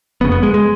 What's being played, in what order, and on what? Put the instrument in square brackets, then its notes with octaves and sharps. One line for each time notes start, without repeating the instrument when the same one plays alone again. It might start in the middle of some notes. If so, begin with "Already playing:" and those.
[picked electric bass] F#1 F2 C#3 B3
B3
G#3
G#3